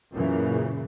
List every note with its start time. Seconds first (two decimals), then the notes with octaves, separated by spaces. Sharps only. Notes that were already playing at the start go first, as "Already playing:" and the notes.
0.12 F#2 A#2 C#3 E3